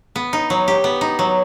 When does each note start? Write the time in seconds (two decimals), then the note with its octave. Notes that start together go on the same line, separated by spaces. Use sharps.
0.16 B3
0.33 D#4
0.50 F#3
0.68 G4
0.84 B3
1.01 D#4
1.19 F#3